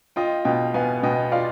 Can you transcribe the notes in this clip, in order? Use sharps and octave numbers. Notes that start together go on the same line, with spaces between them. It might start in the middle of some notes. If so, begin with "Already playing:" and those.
F4 D#5 G5
B2 D#5 G5
B3 F5 G#5
B2 D#5 G5
F4 D5 F5